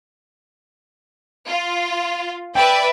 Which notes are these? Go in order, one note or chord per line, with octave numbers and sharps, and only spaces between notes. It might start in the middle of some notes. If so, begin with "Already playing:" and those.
F4
B4 D5 E5 G5